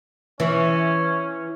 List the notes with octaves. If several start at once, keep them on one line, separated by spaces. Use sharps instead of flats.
E3 C#4